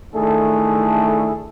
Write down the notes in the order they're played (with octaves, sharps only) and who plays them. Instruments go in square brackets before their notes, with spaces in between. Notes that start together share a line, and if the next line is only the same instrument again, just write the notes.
[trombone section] D#3 A3 D4 E4 G#4 A4